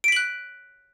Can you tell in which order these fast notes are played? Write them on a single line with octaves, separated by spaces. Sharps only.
D7 B6 F#7 F#6